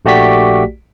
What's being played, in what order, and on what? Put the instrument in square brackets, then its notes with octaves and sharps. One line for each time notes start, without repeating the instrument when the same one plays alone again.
[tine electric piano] A#1 A3 F#4 G4 D5 B6